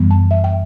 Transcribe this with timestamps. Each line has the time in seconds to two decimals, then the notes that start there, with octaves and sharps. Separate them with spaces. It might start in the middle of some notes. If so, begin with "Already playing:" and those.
Already playing: F#2 E3 G3 B3
0.11 A5
0.31 E5
0.44 G5